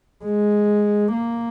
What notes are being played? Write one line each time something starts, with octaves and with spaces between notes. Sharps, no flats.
G#3
A#3